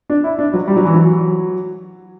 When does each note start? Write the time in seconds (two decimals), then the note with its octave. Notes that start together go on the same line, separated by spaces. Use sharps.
0.10 D4
0.24 E4
0.39 D4
0.54 F#3
0.68 G3
0.76 F#3
0.85 E3
0.94 F#3